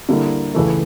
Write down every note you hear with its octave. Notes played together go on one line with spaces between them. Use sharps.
D3 G3 A#3 E4
C#2 C#3 E3 A3